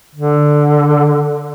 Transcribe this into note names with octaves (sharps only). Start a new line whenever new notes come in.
D3